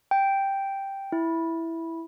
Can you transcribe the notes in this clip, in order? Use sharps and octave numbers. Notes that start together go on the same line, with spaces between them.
G5
E4